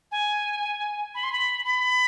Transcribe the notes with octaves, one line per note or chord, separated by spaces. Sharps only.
G#5
B5
C6
B5
B5